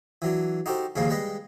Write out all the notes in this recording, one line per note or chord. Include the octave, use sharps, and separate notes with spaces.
E3 F#3 D4
D#4 F#4 G4 A4 C5
D#2 A#2 C#3 F3 G#3 A#3
G3 G#3 B4 D#5